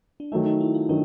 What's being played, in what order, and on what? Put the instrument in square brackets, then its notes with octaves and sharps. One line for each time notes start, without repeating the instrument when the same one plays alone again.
[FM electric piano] D4
[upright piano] D#3 F#3 A3 [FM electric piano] D#4
[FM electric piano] D#4
E4
F4
[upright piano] D#3 F#3 [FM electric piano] D4